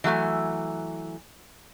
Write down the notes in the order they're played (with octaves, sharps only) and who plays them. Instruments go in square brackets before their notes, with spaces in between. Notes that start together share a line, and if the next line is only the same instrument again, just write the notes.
[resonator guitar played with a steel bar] E3 F#3 A3 G#5